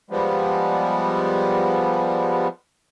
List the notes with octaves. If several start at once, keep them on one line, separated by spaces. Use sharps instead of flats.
F3 G3 G#3 B3